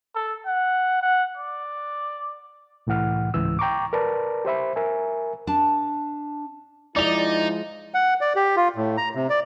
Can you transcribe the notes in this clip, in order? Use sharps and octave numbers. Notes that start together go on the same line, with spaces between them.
A4
F#5
F#5
D5
C2 A2 E3 F#5 F6
C#2 G#2 E3 E6
G5 A#5 C#6 D6
A#4 B4 D5 A5 A#5
G4 C5 E5 B5
A#4 E5 G#5
D4 A5
F3 G#3 D#4 E4 D5 F7
F#5
D5
G4
F4
A2
A#5
C3
D5